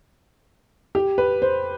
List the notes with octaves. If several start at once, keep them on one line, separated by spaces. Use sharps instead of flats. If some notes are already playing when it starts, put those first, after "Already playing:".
G4
B4
C5